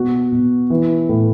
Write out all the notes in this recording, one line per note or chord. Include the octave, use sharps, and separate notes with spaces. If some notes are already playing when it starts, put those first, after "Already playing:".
Already playing: B2 F#4
B2
E3
A2